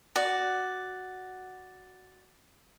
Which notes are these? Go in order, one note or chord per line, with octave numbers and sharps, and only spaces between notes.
F#4 D5